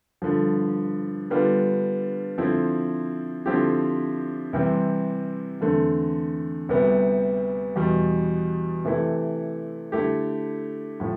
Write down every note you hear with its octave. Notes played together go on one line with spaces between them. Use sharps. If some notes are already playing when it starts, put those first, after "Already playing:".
G2 D3 F3
D3 G3 B3 D4 F4
D3 F3 C4 E4
D3 F3 C4 E4 G4
C3 E3 G3 C4
E2 D3 A3 C4
D2 C3 G3 B3
E2 B2 G3
C3 E3 A3 E4
D3 A3 E4 G4
A2 F3